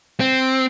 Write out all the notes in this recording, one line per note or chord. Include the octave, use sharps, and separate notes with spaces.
C4